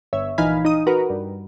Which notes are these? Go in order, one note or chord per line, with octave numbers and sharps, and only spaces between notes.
G1 C#5 E5
A#1 E3 D#4 F5 G#5 B5
D#4 D#6
F#4 A#4 B4
G2